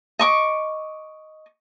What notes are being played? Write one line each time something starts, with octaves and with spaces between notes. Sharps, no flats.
D#5 C#6 D6